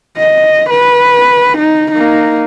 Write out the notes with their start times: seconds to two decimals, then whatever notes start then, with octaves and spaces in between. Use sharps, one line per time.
0.17 D#5
0.70 B4
1.58 D#4
1.92 A#3 D#4